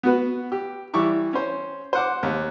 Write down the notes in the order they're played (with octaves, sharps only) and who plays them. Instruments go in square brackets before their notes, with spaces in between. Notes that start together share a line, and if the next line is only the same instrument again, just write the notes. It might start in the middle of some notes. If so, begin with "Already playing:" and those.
[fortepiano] B3 F#4 B4
G4
E3 G3 E4 C#6 D6
C#4 C5
C5 F#5 D6
D#2